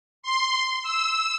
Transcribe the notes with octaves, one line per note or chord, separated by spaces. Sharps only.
C6
E6